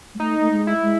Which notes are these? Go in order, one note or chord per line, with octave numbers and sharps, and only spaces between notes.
G#3
A3 D#4
A3
G#3
E4
G#3